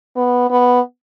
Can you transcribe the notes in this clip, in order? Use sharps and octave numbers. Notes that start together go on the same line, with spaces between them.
B3
B3